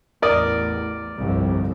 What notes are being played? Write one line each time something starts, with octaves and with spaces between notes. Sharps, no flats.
A1 E2 A#4 D5 D#6
G1 C2 F2